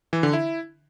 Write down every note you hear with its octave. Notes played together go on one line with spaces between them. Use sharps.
E3
D3
E4